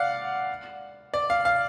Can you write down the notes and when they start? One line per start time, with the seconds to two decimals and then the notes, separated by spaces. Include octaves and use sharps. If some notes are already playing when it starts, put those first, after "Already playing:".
Already playing: D5 F5 F#5
1.14 D5
1.30 F5
1.45 F5